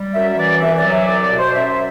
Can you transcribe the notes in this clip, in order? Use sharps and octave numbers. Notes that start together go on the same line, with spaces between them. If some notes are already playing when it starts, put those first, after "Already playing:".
Already playing: G3
F#2 E5
E5
E3 D5
C2 E5
D5
F#3
E5
C2 D5
D5
B2
C5
F#2 E5
E5